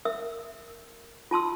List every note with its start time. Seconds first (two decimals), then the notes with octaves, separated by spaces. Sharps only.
0.05 A#4 E5 E6
1.31 F4 A5 C6 E6